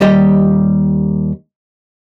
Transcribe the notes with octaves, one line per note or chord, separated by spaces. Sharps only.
D#2 G3 G4 D#5